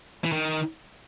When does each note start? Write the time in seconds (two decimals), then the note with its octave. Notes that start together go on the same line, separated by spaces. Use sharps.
0.24 E3
0.32 D#3